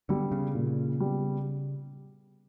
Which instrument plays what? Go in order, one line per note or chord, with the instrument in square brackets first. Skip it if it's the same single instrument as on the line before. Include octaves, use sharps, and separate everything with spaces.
[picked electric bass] D3 [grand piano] G3 B3
[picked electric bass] C#3
[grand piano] A#2
G3 B3